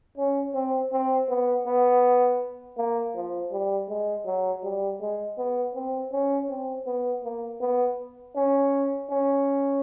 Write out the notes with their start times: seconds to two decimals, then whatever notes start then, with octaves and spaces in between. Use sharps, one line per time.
0.17 C#4
0.54 C4
0.92 C4
1.29 B3
1.66 B3
2.78 A#3
3.15 F3
3.51 G3
3.89 G#3
4.26 F#3
4.63 G3
5.01 G#3
5.38 B3
5.75 C4
6.12 C#4
6.49 C4
6.87 B3
7.24 A#3
7.61 B3
8.36 C#4
9.10 C#4